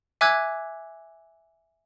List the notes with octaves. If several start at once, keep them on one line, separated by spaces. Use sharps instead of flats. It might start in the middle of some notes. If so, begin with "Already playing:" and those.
E5 G#5 D6 E6 F#6 G#6